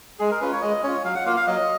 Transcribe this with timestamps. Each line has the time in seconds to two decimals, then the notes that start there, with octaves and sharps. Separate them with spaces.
0.19 G#3 G#4
0.31 A#4
0.41 C#4 F4 B4
0.52 C#5
0.62 G#3 D#5
0.83 C#4 F4 C#5
1.04 F#3 F5
1.15 F#5
1.26 A#3 F4 F5
1.37 F5
1.47 F#3 D#5